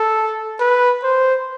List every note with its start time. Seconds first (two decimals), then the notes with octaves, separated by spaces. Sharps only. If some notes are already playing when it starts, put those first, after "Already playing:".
Already playing: A4
0.60 B4
1.04 C5